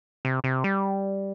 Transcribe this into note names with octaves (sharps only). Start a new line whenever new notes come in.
C3
C3
G3